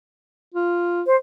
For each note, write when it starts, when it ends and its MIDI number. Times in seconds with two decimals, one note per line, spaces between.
0.54 1.03 65
1.07 1.16 72